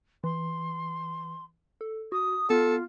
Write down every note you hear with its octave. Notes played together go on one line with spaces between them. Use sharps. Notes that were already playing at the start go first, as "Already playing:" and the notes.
E3 C6
A4
F#4 D#6
B3 F4 A4